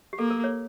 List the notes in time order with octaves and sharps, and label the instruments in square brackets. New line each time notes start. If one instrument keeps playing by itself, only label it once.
[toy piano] G4
[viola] A#3 [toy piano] A4
[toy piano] A#4
C#5